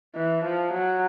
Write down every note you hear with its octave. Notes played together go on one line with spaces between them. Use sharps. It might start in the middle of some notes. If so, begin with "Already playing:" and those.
E3
F3
F#3